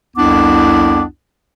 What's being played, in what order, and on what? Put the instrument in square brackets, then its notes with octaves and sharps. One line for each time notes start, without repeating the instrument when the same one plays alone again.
[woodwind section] C2 F2 B3 D4 E4 D6